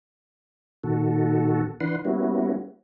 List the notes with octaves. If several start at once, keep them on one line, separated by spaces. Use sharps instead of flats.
A#2 D#3 F#4 A4
E3 D4 B4 F#5 C6
G3 A#3 B3 C#4 E4 F#4